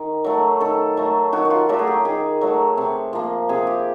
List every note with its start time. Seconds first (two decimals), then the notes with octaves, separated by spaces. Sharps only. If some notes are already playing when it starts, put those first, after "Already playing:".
Already playing: D#3
0.24 F#3 A3
0.60 D#3 A4
0.97 F#3 A3
1.33 D#3 F#4
1.45 F#4
1.50 F4
1.69 F#3 A3 G4
1.79 G#4
1.87 G4
2.05 D#3 G#4
2.41 F#3 A3
2.77 C3
3.13 F3 A#3
3.49 C3 G#4
3.67 G4